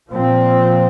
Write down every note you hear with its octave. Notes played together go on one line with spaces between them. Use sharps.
A#2 F3 C4